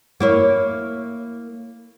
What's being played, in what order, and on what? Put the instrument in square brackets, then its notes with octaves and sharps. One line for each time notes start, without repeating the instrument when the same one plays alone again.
[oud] A#3 E4 C#5